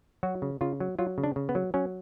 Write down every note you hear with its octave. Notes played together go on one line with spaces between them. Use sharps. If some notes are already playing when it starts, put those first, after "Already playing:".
F#3 F#4
C#3
C#3 F4
F#3
F#3 F4
C#3
D4
C#3
B3
F#3
F#3 C#4